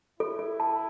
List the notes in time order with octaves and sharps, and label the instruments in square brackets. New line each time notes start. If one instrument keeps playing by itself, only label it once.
[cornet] E4 [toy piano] A4
[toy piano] A4
A5